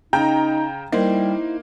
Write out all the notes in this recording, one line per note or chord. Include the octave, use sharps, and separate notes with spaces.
C#3 D#4 G5 A#5
G3 A#3 D#4 E4 C5